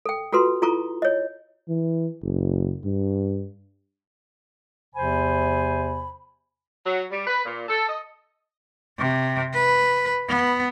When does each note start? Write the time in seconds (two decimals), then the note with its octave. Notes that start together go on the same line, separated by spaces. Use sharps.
0.06 A4 G5
0.33 F4 F#4 A4 B4 C6
0.62 E4 F4 A4 A#5 C#6
1.02 C#5 D#5
1.68 E3
2.22 F#1
2.85 G2
4.95 E2 C3 F3 C5 G#5 B5
6.85 F#3
7.11 G3
7.26 B4
7.44 A#2
7.68 A4
7.88 D#5
8.99 C3
9.54 B4
10.29 B3